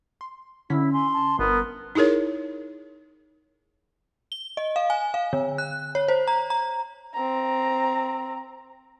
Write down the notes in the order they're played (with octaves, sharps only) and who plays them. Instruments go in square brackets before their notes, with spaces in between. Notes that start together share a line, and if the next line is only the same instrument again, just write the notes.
[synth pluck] C6
[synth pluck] D3 C#4 B6 [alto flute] E4
[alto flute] G#5 [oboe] C6
[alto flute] A5
[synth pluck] G1 [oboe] B3 [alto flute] A#4
[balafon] D#4 E4 G#4 A#4 C#5
[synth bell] G7
D#5
F5
G#5
F5
D3
F#6
C#5
C5
A#5
A#5
[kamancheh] C4 A#5